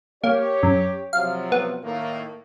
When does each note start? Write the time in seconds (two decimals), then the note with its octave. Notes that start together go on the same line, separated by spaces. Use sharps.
0.24 A#3 G4 C#5
0.63 F#2
1.13 C3 F3 F#3 F5
1.52 B3
1.83 A2 D#3 A#3